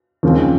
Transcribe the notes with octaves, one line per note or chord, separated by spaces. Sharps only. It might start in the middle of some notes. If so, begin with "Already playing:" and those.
D#2 C#3 F3 G#3 C4